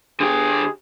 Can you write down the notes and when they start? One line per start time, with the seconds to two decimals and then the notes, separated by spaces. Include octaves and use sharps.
0.20 D3 G4 G#4